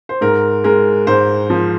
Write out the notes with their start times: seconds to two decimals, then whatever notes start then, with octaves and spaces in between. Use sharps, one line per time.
0.09 C5
0.21 G#2 A#4
0.64 G#3 A#4
1.07 G#2 C5
1.50 F3